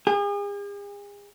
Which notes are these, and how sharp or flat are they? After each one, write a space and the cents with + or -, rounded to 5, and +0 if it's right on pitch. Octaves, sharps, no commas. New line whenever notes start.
G#4 -40